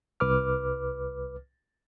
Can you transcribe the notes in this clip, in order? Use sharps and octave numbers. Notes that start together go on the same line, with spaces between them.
C2 B4 D6 F6